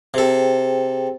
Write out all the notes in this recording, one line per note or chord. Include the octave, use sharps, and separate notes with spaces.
C3 G#4 A4 C5 G5